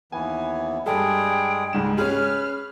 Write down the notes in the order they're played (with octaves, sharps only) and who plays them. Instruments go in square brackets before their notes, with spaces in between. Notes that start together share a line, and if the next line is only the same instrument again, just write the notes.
[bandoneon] D#2 E3 B3 [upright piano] G#5
[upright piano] G2 A4 [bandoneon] G3 G#3 G#4 [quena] G5
[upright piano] C#2 G#2 E7 [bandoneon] G3 G#3
[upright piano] C#4 G#4 [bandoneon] B4 [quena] F6